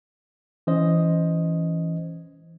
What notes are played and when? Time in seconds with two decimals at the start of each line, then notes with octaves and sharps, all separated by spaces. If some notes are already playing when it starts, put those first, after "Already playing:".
0.67 E3 C#4 C5 D#5